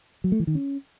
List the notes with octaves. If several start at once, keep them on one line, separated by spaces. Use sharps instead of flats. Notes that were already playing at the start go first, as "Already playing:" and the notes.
F#3
A3
E3
D#3
C#4